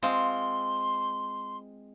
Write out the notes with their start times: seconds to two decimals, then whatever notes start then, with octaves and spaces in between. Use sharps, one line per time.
0.03 G#3 C4 F4 C6